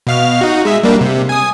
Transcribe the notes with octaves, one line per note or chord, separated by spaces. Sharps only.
B2 F5 F6
D#4 F#4
G#3 E5
G3 A#3 D4
C3
G#5 D#6